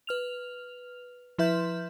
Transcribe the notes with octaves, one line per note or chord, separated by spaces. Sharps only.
B4 F6 F7
F3 E4 B4 E5 C6 G6